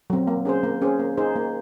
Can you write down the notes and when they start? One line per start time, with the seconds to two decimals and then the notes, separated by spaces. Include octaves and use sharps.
0.10 F#3 C4
0.27 A#3
0.45 C#4 G#4 C5
0.63 A#3
0.82 C#4 G#4 C5
0.99 A#3
1.17 D#4 G#4 C5
1.36 A#3